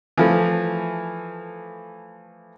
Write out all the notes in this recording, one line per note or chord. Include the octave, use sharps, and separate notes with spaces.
E3 F3 A3